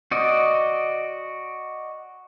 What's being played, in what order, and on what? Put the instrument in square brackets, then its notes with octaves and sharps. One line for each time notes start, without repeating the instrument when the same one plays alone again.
[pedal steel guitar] F#4 D5 D#5